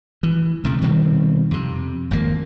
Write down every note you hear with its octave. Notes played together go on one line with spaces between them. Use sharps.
E3
D2 C3 A3
B2 D#3 G3 C4
F2 C3
G#1 F2 C3 A#3